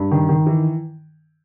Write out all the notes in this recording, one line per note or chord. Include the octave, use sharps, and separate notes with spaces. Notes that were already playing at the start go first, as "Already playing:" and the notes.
Already playing: G2
D#3
D#3
E3